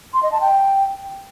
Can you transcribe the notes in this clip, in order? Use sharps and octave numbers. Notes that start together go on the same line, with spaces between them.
C6
D#5
A5
G5